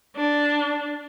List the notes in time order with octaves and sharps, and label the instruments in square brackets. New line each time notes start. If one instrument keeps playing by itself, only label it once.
[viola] D4